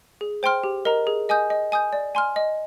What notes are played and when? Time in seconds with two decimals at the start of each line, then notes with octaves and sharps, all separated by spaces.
0.21 G#4
0.43 C5 G5 C6 F6
0.64 G4
0.85 A#4 D#5 A#5
1.07 G#4
1.29 D#5 G#5 D#6 G6
1.50 D#5
1.72 G#5 D#6 G6
1.93 D5
2.15 G#5 C6 F6
2.36 D#5